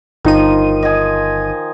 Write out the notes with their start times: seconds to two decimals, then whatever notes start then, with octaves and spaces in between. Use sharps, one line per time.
0.25 G1 D#3 F3 D#4 D#7
0.83 D#5 G#5